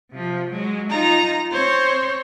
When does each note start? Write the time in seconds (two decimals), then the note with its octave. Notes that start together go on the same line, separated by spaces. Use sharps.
0.11 C3 F3
0.50 F#3 G#3
0.91 D#4 F4 A#5
1.52 C4 C5 C#5